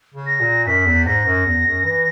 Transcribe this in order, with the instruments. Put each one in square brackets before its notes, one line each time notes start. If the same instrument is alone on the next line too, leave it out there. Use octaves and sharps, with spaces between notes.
[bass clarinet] C#3
[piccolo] A#6
[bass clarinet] A#2
[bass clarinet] F#2 [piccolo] B6
[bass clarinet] E2
[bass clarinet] G#2 [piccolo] A#6
[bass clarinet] F#2
E2
F#2
E3